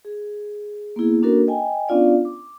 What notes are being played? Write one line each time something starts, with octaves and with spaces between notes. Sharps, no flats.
G#4
A#3 B3 E4 G#4
A#3 C#4 D4 F#4 A4 A#4
D#5 G5 G#5
B3 C#4 D4 F4 D5 F5
D6